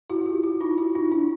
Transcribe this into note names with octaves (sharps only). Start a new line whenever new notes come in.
E4 F#4
F4 G4
E4 F#4
D#4 F4
E4 F#4
D#4 F4
D4 E4